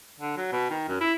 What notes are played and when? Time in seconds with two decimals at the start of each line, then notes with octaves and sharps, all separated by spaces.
0.20 D3
0.37 F#3
0.52 B2
0.70 D#3
0.88 F#2
1.01 E4